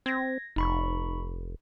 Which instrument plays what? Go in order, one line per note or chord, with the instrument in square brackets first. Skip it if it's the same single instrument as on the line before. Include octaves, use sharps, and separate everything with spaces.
[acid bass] C4 [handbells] G#6 A#6
[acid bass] F1 [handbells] D#4 B5 C#6